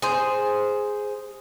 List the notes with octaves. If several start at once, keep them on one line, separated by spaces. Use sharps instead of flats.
G#4 C5